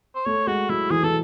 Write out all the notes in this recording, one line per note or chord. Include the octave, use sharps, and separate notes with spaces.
C5
A3 C#5
G#3 F#4
F#3 E4
E3 G#4
E3 A4